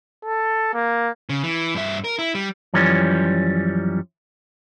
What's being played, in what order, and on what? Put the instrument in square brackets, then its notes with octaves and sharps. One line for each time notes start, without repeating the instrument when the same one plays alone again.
[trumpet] A4
A#3
[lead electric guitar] C#3
E3
G2 E5
A#4
E4
G3
[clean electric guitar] F#2 E3 F3 G3 C#4